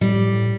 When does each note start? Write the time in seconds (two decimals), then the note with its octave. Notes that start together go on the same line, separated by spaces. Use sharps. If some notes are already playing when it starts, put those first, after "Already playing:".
0.01 A2 G3